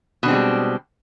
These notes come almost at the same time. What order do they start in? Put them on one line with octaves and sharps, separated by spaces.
B2 D4 C4 G#3 G3